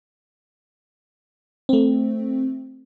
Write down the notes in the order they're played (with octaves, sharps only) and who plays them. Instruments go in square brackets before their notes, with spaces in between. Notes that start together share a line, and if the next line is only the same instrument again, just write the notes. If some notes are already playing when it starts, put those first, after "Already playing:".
[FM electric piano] A3 C4